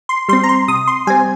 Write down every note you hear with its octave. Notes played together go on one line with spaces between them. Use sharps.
C6
G3 C4 C6
A#5
C6
C3 D#6
C6
G3 C4 G#5